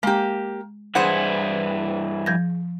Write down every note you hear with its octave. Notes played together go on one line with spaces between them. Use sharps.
G#3 A#3 G4
G2 E3 E4 G#4 C5 F#5
F3 G6 A#6